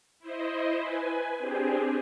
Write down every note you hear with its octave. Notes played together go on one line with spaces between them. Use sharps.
E4 C5 D#5
B4 G#5
C4 D4 G4 G#4 C5